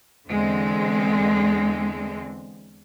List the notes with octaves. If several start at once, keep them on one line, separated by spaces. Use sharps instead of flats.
E2 D3 G#3 C4